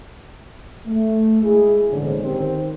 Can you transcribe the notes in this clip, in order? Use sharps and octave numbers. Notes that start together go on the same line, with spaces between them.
A3
G#3 E4 G#4
A#1 E2 G#2 D3 C#4
D#3 C4 G4 C5